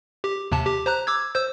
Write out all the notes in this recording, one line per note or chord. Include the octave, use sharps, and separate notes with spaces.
G4
D#2 C3 A5
G4
C5 A#5 F#6
D6 E6 G#6
C5 E6 G6